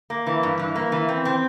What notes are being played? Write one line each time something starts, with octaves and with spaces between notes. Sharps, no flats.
A#3
E3
G2
E3
A#3
E3
C4
C4